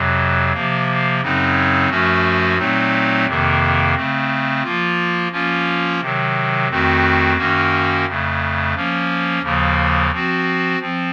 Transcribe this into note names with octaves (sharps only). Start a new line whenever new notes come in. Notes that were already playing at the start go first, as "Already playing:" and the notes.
Already playing: F2 C3 F#3
C3 F3 A#3
F#2 C#3 F#3 C4 D#4
F#2 F3 A3 C#4 F#4
A#2 F#3 A3 C4 D#4
F2 C3 D#3 A#3
C#3 A3 C4
F3 A#3 F4
F3 A#3 C#4 F4
C3 D#3 F#3
F2 D#3 A3 C4 F#4
F#2 D#3 A#3 C#4 F#4
F2 C#3 A3
F3 A#3 C#4
D#2 C#3 F3 A#3
F3 C4 F#4
F3 C4